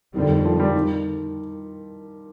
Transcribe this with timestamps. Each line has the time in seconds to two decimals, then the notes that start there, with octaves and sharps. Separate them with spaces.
0.15 F2 D3 D#3 G3 C4
0.30 D#3
0.45 F3
0.60 G3
0.75 D#3